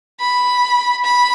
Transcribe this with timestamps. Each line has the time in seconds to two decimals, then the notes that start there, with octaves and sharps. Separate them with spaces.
0.20 B5
1.04 B5